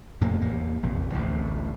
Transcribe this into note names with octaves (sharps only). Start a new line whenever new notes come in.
F2 A2 C3 A#3
E2 A#3
A#1 F2 C3
A1 D2 A2 F3